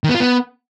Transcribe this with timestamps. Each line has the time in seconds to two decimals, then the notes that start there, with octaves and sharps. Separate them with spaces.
0.04 D#3
0.09 B3
0.15 F4
0.20 B3